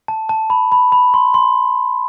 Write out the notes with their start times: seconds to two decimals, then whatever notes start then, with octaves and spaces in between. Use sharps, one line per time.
0.08 A5
0.29 A5
0.50 B5
0.72 B5
0.92 B5
1.14 C6
1.34 C6